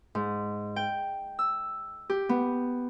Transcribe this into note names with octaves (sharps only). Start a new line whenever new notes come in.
G#2
G5
E6
G4
B3